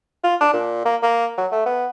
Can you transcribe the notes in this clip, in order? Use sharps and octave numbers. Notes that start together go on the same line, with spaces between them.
F4
D4
A#2
A#3
A#3
F#3
A3
B3